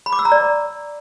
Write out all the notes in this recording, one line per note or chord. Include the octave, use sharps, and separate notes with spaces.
B5
D6
E6
A#5
D5